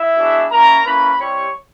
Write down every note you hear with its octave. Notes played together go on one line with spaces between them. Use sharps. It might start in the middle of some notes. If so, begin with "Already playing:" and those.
Already playing: E4 E5
G#3 B3 D4 F#4
A#3 C#4 E4 A#4 A#5
A#3 C#4 E4 B4 B5
G3 C4 E4 G4 C#5 C#6